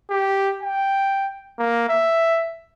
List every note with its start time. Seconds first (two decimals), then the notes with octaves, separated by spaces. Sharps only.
0.10 G4
0.62 G5
1.59 A#3
1.89 E5